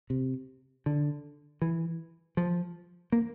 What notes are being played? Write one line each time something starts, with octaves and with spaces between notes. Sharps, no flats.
C3
D3
E3
F3
A#3